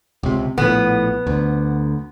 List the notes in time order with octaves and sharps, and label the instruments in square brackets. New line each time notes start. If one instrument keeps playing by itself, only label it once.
[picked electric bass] C#2 C3
[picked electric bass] A#1 A2 [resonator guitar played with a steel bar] B3
[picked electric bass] D2